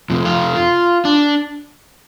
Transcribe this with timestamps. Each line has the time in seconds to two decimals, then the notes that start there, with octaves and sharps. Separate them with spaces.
0.10 F2 C3
0.25 F4
1.05 D4